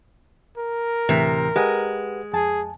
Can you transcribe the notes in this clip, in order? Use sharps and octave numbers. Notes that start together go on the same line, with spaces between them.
A#4
D2 A2 C3 E3
G#3 G4 B4 F#5
F2 G#4 G#5 A5